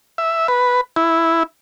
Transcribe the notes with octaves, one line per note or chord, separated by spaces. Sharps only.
E5
B4
E4